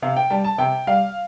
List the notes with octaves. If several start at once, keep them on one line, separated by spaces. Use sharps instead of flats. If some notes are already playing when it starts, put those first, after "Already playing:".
C3 F5
G5
G3 A5
A5
C3 G5
G3 F5